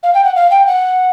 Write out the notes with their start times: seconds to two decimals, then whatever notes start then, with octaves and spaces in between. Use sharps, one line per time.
0.03 F5
0.14 G5
0.24 F#5
0.35 F5
0.50 G5
0.66 F#5